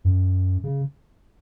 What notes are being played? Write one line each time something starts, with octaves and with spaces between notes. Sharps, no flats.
F#2
C#3